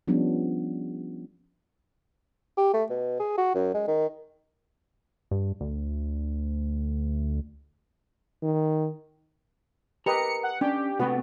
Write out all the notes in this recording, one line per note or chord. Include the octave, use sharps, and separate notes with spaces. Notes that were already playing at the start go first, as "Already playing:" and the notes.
F3 G3 B3 C#4 D4
G4
A3
B2
G#4
F#4
F#2
G#3
D#3
G2
D2
D#3
G4 A#4 B4 D#5 A#5 C#7
F#5
C#4 D4 G4
C3 A3 B3 F#4 G5